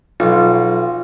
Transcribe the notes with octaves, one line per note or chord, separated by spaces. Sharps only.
B1 F4